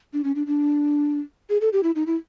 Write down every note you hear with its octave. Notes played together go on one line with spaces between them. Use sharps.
D4
C#4
D4
D4
G#4
A4
G4
E4
D#4
E4